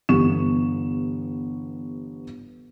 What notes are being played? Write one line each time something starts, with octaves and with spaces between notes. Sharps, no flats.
G1 E3 B3 G4 C#6 E7